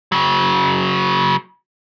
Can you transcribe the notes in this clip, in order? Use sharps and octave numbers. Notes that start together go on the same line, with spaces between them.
C#3 F#3